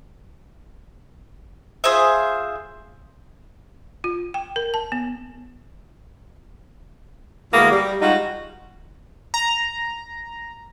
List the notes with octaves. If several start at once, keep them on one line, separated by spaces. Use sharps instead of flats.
F4 G#4 C5 E5
F4
G5
A#4
A5
B3
D2 G#3 A#3 B3 E4 A#4
G3
G3 G#3 D#4 F4 F#4
A#5